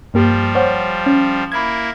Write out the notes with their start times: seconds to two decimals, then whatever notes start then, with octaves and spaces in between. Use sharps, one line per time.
0.14 G2 F3 G3 A#3 G4
0.55 C5 C#5 F#5
1.06 C#4
1.52 A#3 E4 B5 G#6